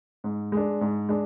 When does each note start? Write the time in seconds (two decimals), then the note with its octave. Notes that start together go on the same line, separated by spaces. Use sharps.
0.24 G#2
0.52 G#3 D4
0.81 G#2
1.09 G#3 D4